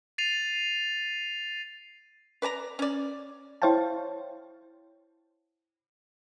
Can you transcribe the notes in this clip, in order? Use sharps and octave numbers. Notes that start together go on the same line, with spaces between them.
A6 C7 D#7 F7
B4 D5 A5 A#5
C#4 D5
E4 C5 C#5 F5 G5 A5